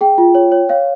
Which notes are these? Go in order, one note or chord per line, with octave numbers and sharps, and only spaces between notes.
G#4 G5
F4
C#5
C#5
C#5 F5